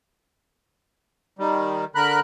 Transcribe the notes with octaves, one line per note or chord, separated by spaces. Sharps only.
D#3 G3
D3 A#4 B5 F#6